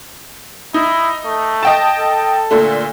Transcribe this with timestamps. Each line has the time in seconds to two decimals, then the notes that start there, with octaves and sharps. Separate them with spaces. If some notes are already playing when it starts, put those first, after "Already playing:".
0.74 D#4 E4
1.25 A3
1.63 D#5 G5 A5
1.99 A4
2.51 A#2 D3 A3